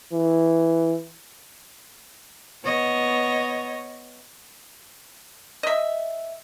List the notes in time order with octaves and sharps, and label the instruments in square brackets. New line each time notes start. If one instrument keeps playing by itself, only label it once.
[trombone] E3
[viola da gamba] B3 C#5 D#5
[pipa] D#5 E5